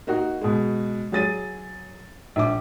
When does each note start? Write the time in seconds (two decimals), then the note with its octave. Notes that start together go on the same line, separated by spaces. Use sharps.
0.07 A#3 D#4 F#4
0.41 B2 G#3
1.12 F#3 G#4 A6 D#7
2.36 A#1 D6